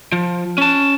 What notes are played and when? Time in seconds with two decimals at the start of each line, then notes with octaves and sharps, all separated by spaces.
0.12 F3
0.58 C#4 A5